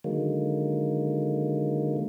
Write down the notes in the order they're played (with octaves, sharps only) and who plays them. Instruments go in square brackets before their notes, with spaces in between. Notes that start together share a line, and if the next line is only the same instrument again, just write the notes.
[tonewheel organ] D3 D#3 F#3 G#3 A#3